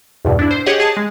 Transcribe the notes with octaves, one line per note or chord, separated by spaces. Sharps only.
E2 G2 B2
D4 E4
C5
G4 G#4 C#5 D#5 F#5
G#4 A5
G#3